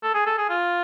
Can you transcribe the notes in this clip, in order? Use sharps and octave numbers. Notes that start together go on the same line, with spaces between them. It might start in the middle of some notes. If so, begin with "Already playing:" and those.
A4
G#4
A4
G#4
F4